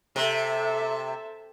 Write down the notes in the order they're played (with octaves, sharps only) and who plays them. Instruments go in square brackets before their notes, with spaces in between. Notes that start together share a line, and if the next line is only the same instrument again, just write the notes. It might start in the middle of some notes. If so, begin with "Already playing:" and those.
[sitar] C3 [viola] A4 E5